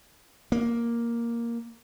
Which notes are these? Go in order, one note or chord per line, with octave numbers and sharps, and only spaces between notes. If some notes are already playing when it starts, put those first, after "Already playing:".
A#3